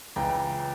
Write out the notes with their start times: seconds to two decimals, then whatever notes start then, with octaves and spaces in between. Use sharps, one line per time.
0.16 C#2 C#3 E3 G5 A#5
0.30 G5 A#5